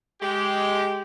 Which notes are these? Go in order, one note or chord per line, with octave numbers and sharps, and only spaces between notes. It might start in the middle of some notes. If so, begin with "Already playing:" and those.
G#3 G4